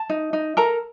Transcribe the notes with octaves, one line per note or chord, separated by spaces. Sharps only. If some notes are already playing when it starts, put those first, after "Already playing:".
Already playing: A5
D#4
D#4
A4 A#4 A#5